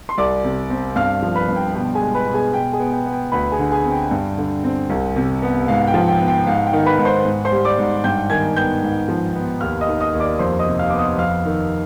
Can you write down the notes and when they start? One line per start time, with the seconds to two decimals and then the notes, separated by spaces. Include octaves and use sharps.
0.09 C6
0.18 C2 D5 D6
0.44 C3
0.70 C4
0.96 G2 F5 F6
1.22 F3
1.35 B4 B5
1.48 G2
1.56 G5
1.75 B2 G5
1.95 G#4 G#5
2.02 G#3
2.14 B4 B5
2.27 B2
2.34 G#4 G#5
2.53 B2 G5
2.73 G#4 G#5
2.79 B3
2.92 G5
3.06 B3
3.12 G5
3.32 D2 B4 B5
3.52 G#4 G#5
3.59 D3
3.71 G#4 G#5
3.85 C4
3.91 G5
4.11 G2
4.38 D3
4.64 C4
4.90 C2
5.16 C3
5.42 B3
5.68 G#2 F5
5.87 G5
5.94 F3
6.08 G5
6.20 B3
6.28 G5
6.47 G#2 F5
6.66 G5
6.73 D#3
6.86 B4 B5
6.99 G#2
7.05 C5 C6
7.25 G#2
7.45 C5 C6
7.52 G3
7.65 D5 D6
7.78 G#2
8.04 G2 G5 G6
8.30 D#3 G#5 G#6
8.56 B3 G5 G6
8.82 G#2
9.08 F3
9.35 B3
9.61 D#2 F5 F6
9.81 D#5 D#6
9.88 D#3
10.01 D#5 D#6
10.13 D#2
10.20 D5 D6
10.39 F2 C5 C6
10.59 D#5 D#6
10.66 C3
10.79 F5 F6
10.90 B3 D6
10.99 D#5 D#6
11.18 F2 F5 F6
11.45 D#3